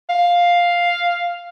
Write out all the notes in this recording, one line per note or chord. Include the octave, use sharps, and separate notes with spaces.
F5